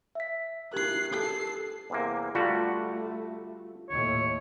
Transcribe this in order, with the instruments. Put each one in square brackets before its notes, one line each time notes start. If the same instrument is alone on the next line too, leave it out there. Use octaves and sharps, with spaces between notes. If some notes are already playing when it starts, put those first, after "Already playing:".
[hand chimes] E5 B6
[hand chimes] G4 A#4 [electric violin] F#6 C7
[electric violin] A4 C7
[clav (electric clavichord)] E2 C3 A#3
[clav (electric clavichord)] D3 G3 F#4 [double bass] A3 [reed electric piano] F4
[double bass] D#2 A2 [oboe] C#5